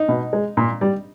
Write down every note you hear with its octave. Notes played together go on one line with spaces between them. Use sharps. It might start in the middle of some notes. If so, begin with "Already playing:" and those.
Already playing: D#4
B2
G#3
A#2
G3